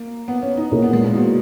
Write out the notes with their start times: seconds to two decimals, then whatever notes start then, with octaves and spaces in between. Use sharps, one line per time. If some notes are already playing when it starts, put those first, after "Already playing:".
Already playing: A#3
0.28 B3
0.42 C#4
0.57 D#4
0.71 A#2 A#3 C#4 E4 G#4
0.82 B3
0.93 G#3
1.04 A#2
1.15 B2